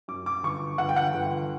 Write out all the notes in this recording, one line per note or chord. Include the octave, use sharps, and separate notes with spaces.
F#2 D6
D6
G1 C#6
G1 F#5
G5
F#5
G1